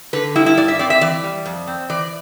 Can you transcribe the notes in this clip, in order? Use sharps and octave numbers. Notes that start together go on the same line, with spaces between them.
D3 B4
G3 E4
E4
G2 D5
E5
C4 D5
E5
E3 D5
G3
F2
C4
E3 D5